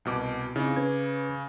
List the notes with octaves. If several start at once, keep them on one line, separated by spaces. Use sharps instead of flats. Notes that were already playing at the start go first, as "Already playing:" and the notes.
C2 B2 D6
C#3 C4 D#4 E4
C#4 B4 G#6